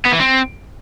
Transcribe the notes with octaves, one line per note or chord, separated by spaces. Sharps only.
B3
E3
C4